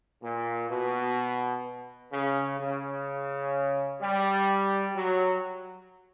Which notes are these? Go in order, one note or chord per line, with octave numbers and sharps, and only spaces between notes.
A#2
B2
C#3
C#3
G3
F#3